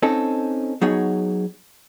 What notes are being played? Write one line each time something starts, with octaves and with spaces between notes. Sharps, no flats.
C4 C#4 D#4 A4
F#3 B3 D#4 G#4 C#5 F#5